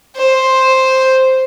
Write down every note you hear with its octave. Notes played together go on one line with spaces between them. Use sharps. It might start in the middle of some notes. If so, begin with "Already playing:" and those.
C5